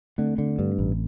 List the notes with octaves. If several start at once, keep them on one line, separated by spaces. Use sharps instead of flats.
D3 A3 C4
D3
G2
A1